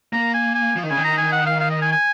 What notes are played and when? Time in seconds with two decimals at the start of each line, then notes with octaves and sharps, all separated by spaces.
0.13 A#3 A#5
0.34 G#5
0.55 G#5
0.76 F3
0.83 D#3
0.90 C#3 G#5
0.97 D#3
1.04 A#5
1.18 G#5
1.32 F#5
1.46 F5
1.60 F5
1.70 D#5
1.82 G#5
1.92 G#5